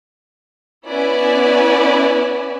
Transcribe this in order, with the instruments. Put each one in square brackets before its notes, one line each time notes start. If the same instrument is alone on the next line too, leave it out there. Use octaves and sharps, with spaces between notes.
[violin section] B3 C#4 E4 B4 D5 G#5